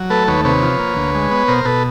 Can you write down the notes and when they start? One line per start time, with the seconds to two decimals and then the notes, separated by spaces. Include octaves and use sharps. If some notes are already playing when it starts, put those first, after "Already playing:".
Already playing: F#3
0.10 A3 A4 B4
0.27 D#2 B4 C#5
0.45 C3 B4 C#5
0.62 F3
0.79 A#3
0.96 D2
1.14 G#3
1.31 B3
1.48 B2 A#4 C5
1.65 B2 A4 B4